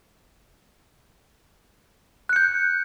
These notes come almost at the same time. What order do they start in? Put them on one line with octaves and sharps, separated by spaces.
F#6 C#7 G6